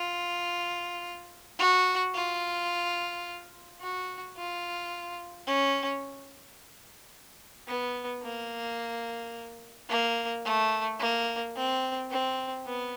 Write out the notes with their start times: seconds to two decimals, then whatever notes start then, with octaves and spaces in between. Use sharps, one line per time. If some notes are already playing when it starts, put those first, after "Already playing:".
Already playing: F4
1.59 F#4
2.14 F4
3.81 F#4
4.37 F4
5.47 C#4
7.68 B3
8.23 A#3
9.89 A#3
10.44 A3
11.00 A#3
11.56 C4
12.11 C4
12.66 B3